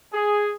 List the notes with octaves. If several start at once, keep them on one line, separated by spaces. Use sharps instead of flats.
G#4